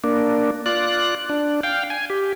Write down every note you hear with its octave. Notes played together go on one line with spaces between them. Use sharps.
A#3 D4
F4 D5 F#6
D4
F5 G5
G#5
G4